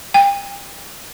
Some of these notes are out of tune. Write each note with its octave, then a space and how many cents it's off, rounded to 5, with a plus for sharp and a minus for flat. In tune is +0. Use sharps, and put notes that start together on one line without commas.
G5 +35